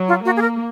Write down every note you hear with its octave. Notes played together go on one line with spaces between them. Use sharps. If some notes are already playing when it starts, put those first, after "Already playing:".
Already playing: F#3
F4
A#3 F#4
G#4
A#4